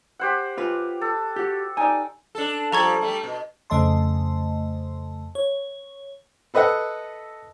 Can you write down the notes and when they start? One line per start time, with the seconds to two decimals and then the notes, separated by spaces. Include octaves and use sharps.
0.19 G4 C5 F#5
0.57 F4 B4
1.01 A4
1.36 F#4 G4
1.77 D#4 D5 G#5
2.35 D4 A4
2.72 F3 G3 A4 A#5 C#6 G#6
3.01 G3 A3
3.23 B2
3.70 F2 C#3 A3 D#5 A5 C6
5.35 C#5
6.54 A4 B4 D#5 E5 F#5